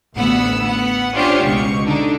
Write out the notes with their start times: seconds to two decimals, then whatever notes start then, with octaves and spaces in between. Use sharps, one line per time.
0.16 A1 D2 B3 F#5 B5 E6
0.65 B3 F#5
1.14 C#4 D4 F4 G4 C5 C#5
1.43 C#2 B2 C#6
1.85 D3 D4 D#4